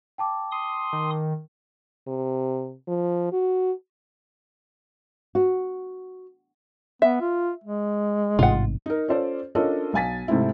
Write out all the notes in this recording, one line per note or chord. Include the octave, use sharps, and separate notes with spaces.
G5 A5 D6
C6 D#6
D#3
C3
F3
F#4
F#4
B3 E5
F4
G#3
A1 G#2 C3 F4 F#5
D#4 A#4
C#4 F4 A4 C5 D5
C#4 D4 F4 A4 A#4 D#5
B1 F5 G#5 A6 B6
G#2 C3 A3 C4 D#4 E4